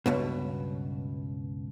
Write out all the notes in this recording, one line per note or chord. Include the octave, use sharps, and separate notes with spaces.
C#2 G2 B2